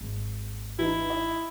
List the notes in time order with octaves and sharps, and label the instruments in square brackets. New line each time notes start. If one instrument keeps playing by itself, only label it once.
[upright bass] G#1 D#2
[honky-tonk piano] E3 D#4 [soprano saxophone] E4
[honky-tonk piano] D#5